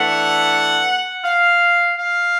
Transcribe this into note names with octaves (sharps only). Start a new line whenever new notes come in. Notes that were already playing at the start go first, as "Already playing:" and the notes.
Already playing: E3 A3 D4 F#5
F5
F5